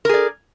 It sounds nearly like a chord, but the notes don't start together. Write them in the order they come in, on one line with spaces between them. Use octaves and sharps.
A#4 G#4 D5